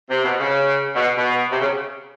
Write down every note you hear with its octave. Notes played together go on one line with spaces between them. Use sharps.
C3
B2
C#3
B2
B2
C3
C#3